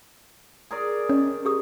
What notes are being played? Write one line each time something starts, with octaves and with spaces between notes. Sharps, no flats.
G#4 A#4 D5
D#3 C#4
G4 G#4 D#6